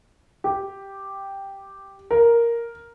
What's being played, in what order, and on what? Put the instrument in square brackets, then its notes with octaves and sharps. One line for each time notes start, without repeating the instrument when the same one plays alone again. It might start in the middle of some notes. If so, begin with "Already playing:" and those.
[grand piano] G4
A#4